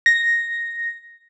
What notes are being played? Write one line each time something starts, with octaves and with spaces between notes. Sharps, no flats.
A#6